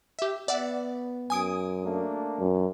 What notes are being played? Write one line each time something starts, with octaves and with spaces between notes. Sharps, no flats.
G4 E5
B3 D5 E5 F#5
F#2 G#5 D#6 D7
A3 A#3 D4
F#2